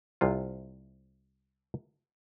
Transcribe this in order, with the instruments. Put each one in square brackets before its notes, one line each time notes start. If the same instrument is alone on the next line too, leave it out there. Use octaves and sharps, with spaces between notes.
[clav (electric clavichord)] C2 C3 F4